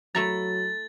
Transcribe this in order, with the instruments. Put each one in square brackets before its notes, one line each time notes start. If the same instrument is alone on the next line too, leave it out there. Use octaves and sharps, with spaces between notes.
[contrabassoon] F#3 [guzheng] A3 E4 A#5 [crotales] A6